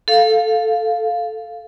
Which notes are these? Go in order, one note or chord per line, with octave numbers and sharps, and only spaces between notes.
A4 F5